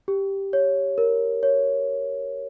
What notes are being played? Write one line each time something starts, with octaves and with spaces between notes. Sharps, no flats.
G4
C#5
A#4
C#5